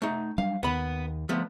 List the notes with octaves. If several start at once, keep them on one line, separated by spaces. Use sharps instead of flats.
A3 D#4
F#3 G3 D4 F5
D#2 D#3 B3 B5
F3 A3 B3